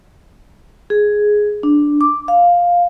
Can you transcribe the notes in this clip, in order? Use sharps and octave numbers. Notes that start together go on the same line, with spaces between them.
G#4
D4
D6
F5